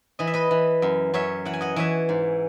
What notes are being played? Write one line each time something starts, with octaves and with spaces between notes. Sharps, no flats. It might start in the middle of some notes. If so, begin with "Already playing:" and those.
E3 D#5
E5
B4 D#5
E3
F#2
F#2 C#5 E5
E3 F#5
G#5
D#5 F#5
E3 C#5 E5
G#2